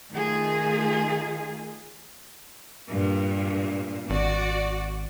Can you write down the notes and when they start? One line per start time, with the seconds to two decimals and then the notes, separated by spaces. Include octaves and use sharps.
0.12 D#3 A3 F4 G#4
2.90 G2 A#2
4.10 G#1 F#4 D5